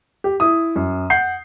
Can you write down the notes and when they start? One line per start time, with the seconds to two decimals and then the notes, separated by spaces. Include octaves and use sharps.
0.24 G4
0.40 E4 D#6
0.76 F#2
1.10 F#5 G6 C7